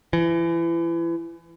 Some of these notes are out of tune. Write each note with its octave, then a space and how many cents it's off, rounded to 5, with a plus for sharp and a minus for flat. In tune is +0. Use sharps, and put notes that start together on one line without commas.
E3 +30